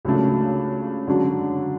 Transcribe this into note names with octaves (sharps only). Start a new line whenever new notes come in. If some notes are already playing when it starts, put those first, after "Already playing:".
C#2 C#3 F#3 A3 D4
F#2 D3 G#3 D4 F#4